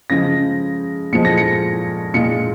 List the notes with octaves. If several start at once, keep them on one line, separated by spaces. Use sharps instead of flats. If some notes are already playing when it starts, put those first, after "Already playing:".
C#3 F3 G#3 A#6
A#2 F3 G#3 C#7
A#6
C#7
A#2 G#3 C#7